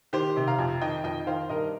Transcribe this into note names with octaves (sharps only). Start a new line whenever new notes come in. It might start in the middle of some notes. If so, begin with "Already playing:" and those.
D#3 G4 C5
C3
F5 A#5
F2
D#3 D#5 G5
F2 D#5 G5
D#3 C5 F5
G2 A#4 D#5